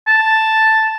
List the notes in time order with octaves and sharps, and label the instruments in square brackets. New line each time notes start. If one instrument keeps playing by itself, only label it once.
[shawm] A5